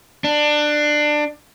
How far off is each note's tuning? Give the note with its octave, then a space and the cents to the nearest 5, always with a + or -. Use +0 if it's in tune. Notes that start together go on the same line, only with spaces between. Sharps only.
D4 +20